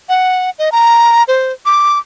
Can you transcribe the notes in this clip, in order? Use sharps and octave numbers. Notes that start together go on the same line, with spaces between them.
F#5
D#5
A#5
C5
D6